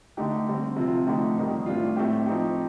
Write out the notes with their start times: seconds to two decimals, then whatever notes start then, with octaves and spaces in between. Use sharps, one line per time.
0.17 D3 A3 D#4 G4
0.46 D3 G3 C4
0.76 C3 F3 C4 F4
1.06 D3 F3 A3 D#4 G4
1.37 F2 D#3 G3
1.66 A2 G3 D4 F4
1.96 A2 A3 C4 G4
2.26 F3 C4 D#4 G4